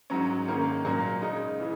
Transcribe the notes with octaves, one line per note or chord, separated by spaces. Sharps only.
G#2 F#3 C#4
G#2 D#3 A#3 C#4
A#2 F#3 A#3
C#3 G#3 D#4
C#3 E3 G#3